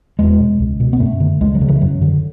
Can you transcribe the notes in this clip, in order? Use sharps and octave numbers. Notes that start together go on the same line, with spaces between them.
E2 G#3
B2
C#2
B2
B3
F#2 A3
D3
C#2 G#3
F#3
C#3
E3
F#2 F#3
D3